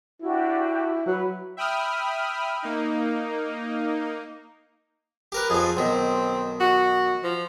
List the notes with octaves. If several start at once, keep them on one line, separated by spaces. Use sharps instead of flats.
D4 E4 F#4 G4
F#3 B4
E5 G5 B5 D#6 F6
A#3 D#4
G4 A#4 B4
F2 F3 G#4
B1 D#3 C4
F#4
F3